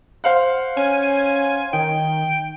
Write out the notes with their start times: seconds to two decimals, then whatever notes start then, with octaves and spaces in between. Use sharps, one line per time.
0.24 C5 F5 F#5
0.77 C#4 G#5
1.73 D#3 G5